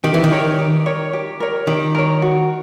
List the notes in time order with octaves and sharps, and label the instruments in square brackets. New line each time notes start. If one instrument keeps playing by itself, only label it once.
[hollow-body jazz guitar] D#3 [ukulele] G4
[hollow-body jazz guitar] E3
D#3
[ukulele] A#4 C#5
G4
A#4 C#5
G4
A#4 C#5
[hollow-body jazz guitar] D#3 [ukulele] G4
[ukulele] A#4 C#5
F#4